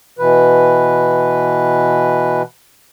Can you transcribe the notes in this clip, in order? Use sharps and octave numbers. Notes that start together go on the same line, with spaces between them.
B2 E3 B4